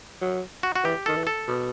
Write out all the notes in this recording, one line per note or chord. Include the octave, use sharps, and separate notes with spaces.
F#3
F#4
F#4
E3 G4
D#3 A4
E3
A4
B2